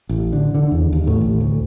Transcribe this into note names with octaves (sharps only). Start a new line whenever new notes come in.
A1
D3
D3
E2
D#2
A2
A1
D2